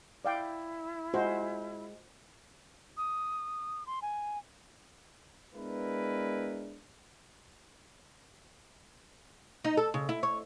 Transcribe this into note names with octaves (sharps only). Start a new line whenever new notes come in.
E4 D5 F5 G5
G#3 F4 F#4 C5
D#6
C6
G#5
G#3 B3 D4 E4 A#4 B4
D#4
A4
C#3
E4
C#5